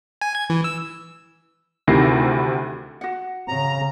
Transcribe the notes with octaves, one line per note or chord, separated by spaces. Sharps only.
G#5
G#6
E3
E6
D2 C3 D#3 E4 A#6 C7
F#4 F#5
C#3 A#5